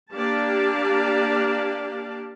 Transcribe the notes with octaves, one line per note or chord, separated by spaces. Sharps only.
A#3 D4 G4 D5 F5 A5